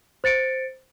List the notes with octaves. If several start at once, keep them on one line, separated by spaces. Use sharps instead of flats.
C5 A6 C#7 D7